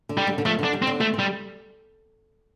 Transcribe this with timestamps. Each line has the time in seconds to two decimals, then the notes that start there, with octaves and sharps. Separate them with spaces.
0.09 D3
0.18 G3
0.27 D3
0.38 D3
0.45 F3 A3
0.59 D3
0.64 D4
0.73 G3
0.82 C4
0.87 D3
1.00 A3 C4
1.14 C4
1.19 G3